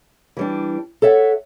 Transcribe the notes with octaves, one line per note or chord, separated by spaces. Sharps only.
E3 G3 D4
A4 C#5 E5 F#5